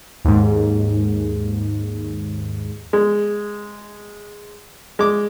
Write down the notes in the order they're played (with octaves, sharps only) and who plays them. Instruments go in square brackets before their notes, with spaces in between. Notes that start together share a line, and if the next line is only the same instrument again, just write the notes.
[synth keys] D#2 G#2
[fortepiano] G#3
G#3 D6